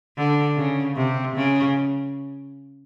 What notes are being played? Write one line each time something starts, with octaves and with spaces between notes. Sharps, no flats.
D3
C#3
C3
C#3